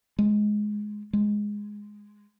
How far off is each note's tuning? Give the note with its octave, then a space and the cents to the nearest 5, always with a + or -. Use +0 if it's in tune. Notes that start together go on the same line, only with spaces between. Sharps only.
G#3 +10
G#3 -5